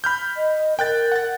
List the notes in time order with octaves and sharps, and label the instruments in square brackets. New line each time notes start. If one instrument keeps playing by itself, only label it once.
[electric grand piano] B5 F6 G6
[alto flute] D#5
[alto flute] A#4 [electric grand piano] G5 F#6 A6
[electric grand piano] F#5 A6